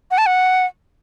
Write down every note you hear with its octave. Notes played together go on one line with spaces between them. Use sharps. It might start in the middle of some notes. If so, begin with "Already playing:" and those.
F#5
A5
F#5